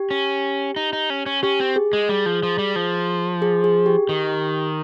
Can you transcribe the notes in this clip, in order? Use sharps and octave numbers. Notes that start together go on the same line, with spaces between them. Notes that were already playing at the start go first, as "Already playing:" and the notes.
Already playing: G4
C#4
D#4
D#4
C#4
C#4
C#4 G4
C4
G#4
G#3
G3
F3
F3
G3
F3
G#4
G#4
G4
D#3